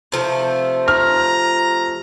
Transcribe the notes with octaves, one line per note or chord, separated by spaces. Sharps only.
C3 F3 A3
A#5 F6